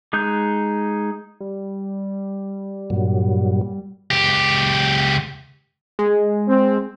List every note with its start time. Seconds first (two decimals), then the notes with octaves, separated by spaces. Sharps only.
0.13 G#3 D#4 F#6 G6
1.40 G3
2.90 G2 A#2 F#3
4.11 C#2 G4
5.99 G#3
6.48 C4